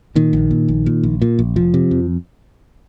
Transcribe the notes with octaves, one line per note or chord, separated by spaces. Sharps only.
A#2 D#3
A#1
A#2
A#1
A#2
A#1
A#2
A#1
F1 F3
C3
F2